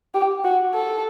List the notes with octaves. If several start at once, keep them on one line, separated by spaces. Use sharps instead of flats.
G4
F#4
A4